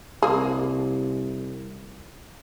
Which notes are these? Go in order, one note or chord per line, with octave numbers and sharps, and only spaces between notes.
C2 A#3 G#4